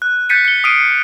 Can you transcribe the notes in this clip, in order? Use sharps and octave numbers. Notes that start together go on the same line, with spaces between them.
F#6
F#6 G6 A6 B6 C#7 D#7
C#7 G7
D#6 F6 B6 C7 D7 D#7